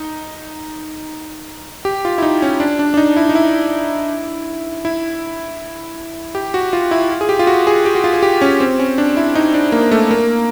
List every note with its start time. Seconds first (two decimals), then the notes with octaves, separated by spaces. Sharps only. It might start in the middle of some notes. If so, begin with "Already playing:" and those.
Already playing: D#4
1.85 G4
2.05 F4
2.18 E4
2.22 D#4
2.42 C#4
2.60 D4
2.79 D4
2.94 D4
2.97 D#4
3.17 E4
3.29 D#4
3.35 E4
4.85 E4
6.35 G4
6.54 F#4
6.73 F4
6.91 E4
7.11 F4
7.21 G#4
7.29 G4
7.39 F4
7.47 F#4
7.67 G#4
7.85 G4
7.95 F#4
8.04 F4
8.14 G#4
8.23 G4
8.41 C#4
8.60 C4
8.79 C#4
8.98 D4
9.17 E4
9.35 D#4
9.54 D4
9.72 A#3
9.91 A3
10.11 A#3